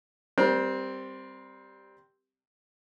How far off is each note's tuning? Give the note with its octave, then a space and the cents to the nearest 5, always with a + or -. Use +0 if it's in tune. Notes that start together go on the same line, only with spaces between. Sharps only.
G3 +0 C4 +0 A#4 +40